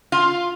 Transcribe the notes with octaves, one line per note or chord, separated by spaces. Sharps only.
F4